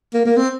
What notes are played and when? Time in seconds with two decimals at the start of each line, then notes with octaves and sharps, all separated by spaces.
0.14 A#3
0.25 A#3
0.37 C4